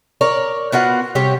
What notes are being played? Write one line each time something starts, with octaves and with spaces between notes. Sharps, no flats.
A#4 C#5 D5
B3 F4 F#4 F#5
C3 G3 G4 C#5